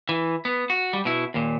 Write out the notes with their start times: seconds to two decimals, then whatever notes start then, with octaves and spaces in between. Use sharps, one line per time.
0.09 E3
0.45 B3
0.70 F#4
0.93 G3
1.05 B2 E4
1.34 D#2 A#2